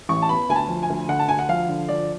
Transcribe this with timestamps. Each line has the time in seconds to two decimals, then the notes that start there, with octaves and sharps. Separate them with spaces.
0.09 A1 C#6
0.22 A5
0.29 B3 B5
0.49 D2 G#5
0.56 A5
0.68 F3
0.83 G#5
0.89 D2
1.08 D3 F#5
1.19 A5
1.28 D2 G#5
1.39 F#5
1.49 F3 F5
1.69 D3
1.88 F3 D5